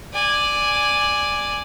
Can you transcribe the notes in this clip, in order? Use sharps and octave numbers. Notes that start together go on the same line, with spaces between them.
D5 G#5